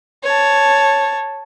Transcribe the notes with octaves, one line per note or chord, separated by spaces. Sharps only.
C#5 A5